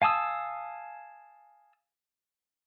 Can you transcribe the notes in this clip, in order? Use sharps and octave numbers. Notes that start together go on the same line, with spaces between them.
F5 G#5 A5 D#6 E6